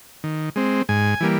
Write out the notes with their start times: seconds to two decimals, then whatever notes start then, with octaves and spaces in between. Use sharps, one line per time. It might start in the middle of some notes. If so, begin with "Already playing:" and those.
0.24 D#3
0.56 G#3 C4
0.89 G#2 G#5
1.20 E3 G3 A#3